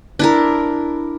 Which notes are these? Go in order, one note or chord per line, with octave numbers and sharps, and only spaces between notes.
D4 E4 A#4